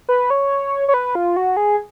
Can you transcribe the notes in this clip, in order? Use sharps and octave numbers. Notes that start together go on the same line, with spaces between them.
B4
C#5
C#5
B4
F4
F#4
G#4